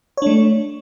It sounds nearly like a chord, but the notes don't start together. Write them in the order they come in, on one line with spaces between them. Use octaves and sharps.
C#5 D4 A3